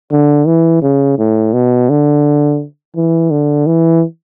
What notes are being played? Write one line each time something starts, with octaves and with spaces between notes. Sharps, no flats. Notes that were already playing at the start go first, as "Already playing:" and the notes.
D3
E3
C#3
A2
B2
D3
E3
D3
E3